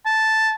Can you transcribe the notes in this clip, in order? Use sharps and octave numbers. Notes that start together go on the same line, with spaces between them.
A5